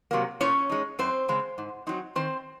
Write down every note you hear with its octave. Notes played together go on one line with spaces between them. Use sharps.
C3 F#3 A#3
A#2 C#4 C#5
G#3 D#4
F#2 C4 C5
C#3 G#3 C4
G#2
F#3 C4 D#4
D#3 C4 C5